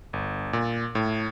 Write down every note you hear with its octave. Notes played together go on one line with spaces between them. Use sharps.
G1
A#2
A2